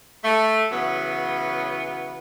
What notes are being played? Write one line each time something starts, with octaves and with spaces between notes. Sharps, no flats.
A3
C#3 E3 F#3 B3